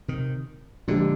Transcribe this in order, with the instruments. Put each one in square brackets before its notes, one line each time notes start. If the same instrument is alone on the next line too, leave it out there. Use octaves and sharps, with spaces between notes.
[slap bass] C3 D#3
[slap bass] A#2 D3 [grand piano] F3 G#3 D4 G4